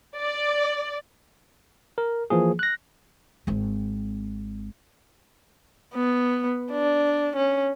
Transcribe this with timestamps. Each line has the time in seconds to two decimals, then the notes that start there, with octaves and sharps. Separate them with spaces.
0.18 D5
1.98 A#4
2.30 E3 F3 A#3 G#4
2.59 F#6 A#6
3.47 G#1 C4
5.94 B3
6.71 D4
7.36 C#4